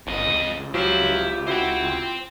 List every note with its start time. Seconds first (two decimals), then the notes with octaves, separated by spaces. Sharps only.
0.07 G1 F2 D#5
0.27 C#2
0.74 F3 F#3 E4 F4 G4
1.47 E4 F#4 C5 G5